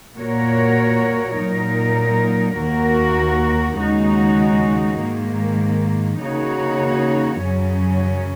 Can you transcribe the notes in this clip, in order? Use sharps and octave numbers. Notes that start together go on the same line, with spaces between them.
A#2 A#3 F#4 A#4 C#5
A#2 F#3 D#4 A#4
D#2 D#3 A#3 F#4 A#4
D#2 C#3 G#3 D#4 F#4
G#2 D#3 A#3
C#3 A#3 D#4 F#4 C#5
F#2 C#3 F#3 C#4